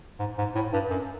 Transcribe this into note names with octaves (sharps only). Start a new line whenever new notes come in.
G#2
G#2
A2
G2
F#2